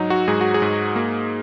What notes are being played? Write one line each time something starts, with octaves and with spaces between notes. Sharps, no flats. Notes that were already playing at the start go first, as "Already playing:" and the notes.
Already playing: G#2 F#3 D#4
F#4
G#2 G#4
F#4
G#4
G#2
A#3